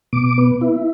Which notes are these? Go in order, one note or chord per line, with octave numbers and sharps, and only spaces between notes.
B2 D6
B3
E4